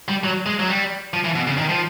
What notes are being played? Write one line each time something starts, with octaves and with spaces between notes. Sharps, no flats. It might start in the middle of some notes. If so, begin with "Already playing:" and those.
G3
F#3
G#3
F#3
G3
F3
E3
B2
C#3
D#3
F3